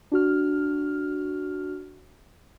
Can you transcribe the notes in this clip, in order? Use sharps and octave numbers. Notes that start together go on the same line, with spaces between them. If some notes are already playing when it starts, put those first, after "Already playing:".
D4 F#4 F6